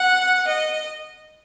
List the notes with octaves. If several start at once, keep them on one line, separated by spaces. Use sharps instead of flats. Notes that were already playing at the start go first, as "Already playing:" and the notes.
Already playing: F#5
D#5